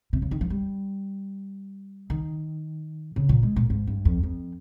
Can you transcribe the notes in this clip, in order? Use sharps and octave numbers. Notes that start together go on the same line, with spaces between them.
C3
C#3
D#3
F3
G3
D#3
C#3
A#2
G#3
A#2
G#2
G2
F2
F2